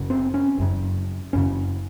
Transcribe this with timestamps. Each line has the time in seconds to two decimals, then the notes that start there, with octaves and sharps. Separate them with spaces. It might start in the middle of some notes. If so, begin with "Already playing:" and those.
Already playing: F#1 F#2 C#3
0.10 C4
0.34 C#4
0.58 F#1 F#2 C#3
1.33 F#1 F#2 C#3 C#4